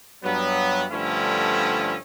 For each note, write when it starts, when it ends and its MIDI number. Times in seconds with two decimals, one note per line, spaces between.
0.24 0.84 43
0.24 0.84 54
0.24 0.84 59
0.91 1.96 43
0.91 1.96 50
0.91 1.96 53
0.91 1.96 57
0.91 1.96 61
0.91 1.96 64